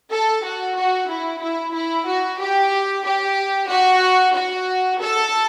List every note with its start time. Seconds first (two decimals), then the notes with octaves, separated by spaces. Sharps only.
0.11 A4
0.44 F#4
0.77 F#4
1.10 E4
1.42 E4
1.74 E4
2.07 F#4
2.40 G4
3.04 G4
3.70 F#4
4.35 F#4
5.00 A4